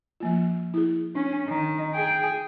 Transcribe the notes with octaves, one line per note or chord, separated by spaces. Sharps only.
F3 A#3 F4
E4 G#4
C#4 D4
D#3 D#4
G#4 G5